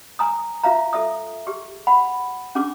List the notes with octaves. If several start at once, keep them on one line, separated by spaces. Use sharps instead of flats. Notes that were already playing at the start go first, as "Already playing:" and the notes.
G#5 A#5 D#6
F4 E5 F5 A#5
A4 E5 D#6
G4 G#4
F#5 B5
C#4 D4 G#4 D6